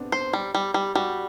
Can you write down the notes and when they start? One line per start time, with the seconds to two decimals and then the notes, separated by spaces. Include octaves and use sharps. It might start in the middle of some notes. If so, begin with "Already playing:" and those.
Already playing: B3 C4 D4
0.12 C5
0.33 G3
0.54 G3
0.74 G3
0.95 G3 F#4